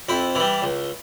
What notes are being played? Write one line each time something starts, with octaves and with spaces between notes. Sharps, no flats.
F2 E4
E3
G3
C#2